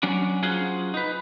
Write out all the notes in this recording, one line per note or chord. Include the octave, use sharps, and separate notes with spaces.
F#3 C#4 D4
F#3 C#4 F4 G#4 C5 F#5
D#4 B4